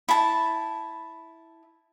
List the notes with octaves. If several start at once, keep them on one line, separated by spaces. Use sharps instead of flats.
E4 A5